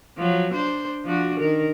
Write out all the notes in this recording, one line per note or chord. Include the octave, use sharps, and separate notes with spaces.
F3 F#3
D4 C5
F3 D4 F#4
D#3 A#4